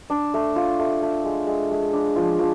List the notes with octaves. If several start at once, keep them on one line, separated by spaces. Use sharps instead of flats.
D4
A3
F4
A3
A3
G#3
G#3
G#3
D4
F3 F4
F3